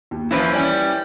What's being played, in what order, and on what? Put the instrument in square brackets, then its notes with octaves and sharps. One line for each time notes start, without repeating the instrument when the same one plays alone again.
[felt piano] D#2
[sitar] F#2 E3 F3 [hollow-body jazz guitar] E4 B4
[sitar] G3 C#4 [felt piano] C#5 D5 G#5